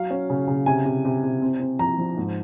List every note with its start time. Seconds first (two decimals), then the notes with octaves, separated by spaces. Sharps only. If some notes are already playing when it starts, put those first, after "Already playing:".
Already playing: F#3 F5
0.10 C#4
0.30 C#3
0.48 C#3
0.66 C3 G#5
0.85 C3
1.05 C3
1.24 C3
1.42 C4
1.60 C4
1.79 F3 A#5
1.98 F3
2.17 G#2